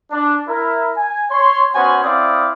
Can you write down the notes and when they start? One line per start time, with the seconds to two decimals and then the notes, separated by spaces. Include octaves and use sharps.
0.11 D4
0.48 E4 A#4
0.97 G#5
1.31 C#5 C6
1.75 B3 C#4 F#4 C5 G#5
2.04 C4 E4 D5 F5 D#6